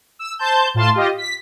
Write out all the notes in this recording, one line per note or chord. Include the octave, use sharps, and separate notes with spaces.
E6
C5 A5 G6
A2 F4 A5 C6
F4 G4 D#5
B6